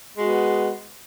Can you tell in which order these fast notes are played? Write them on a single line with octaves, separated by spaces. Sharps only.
G#3 F#4 B3